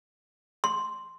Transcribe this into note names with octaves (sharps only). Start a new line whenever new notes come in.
C6